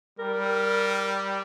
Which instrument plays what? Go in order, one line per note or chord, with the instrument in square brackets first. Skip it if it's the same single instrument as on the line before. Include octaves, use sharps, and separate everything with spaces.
[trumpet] G3 [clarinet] A#4